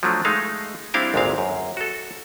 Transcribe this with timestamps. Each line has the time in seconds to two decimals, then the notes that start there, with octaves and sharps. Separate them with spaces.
0.03 F3 F#3 A3 D4
0.25 G#3 A3 D#4 F5
0.94 G3 C4 D4 E4 F5 G5
1.14 G#1 D2 A#2 G#3 C4 F5
1.38 F#2
1.77 F#4 A4